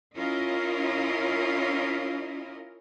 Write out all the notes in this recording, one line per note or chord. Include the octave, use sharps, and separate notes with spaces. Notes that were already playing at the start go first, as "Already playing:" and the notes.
C#4 E4 F4 A#4 D#5